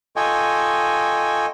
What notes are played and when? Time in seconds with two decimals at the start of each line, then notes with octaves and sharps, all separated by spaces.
0.16 F4 A4 D#5 G5 G#5 C#6